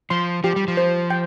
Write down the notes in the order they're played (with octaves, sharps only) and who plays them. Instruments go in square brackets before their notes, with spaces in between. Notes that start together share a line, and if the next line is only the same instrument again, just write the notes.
[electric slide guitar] F3 [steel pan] C6
[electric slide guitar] F3 [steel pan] G4
[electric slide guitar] G3
F3
[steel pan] C5
G5